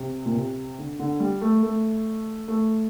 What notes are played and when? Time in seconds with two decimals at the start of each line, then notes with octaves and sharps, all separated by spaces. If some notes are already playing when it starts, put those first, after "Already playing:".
Already playing: C3
0.25 A#2
0.35 C3
0.78 D3
0.99 D3
1.20 G3
1.41 A3
1.63 A3
2.48 A3